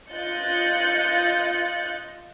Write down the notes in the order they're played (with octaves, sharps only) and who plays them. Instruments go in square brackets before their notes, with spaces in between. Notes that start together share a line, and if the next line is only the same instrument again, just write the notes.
[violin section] F4 D#5 F#6 G6 A6 C#7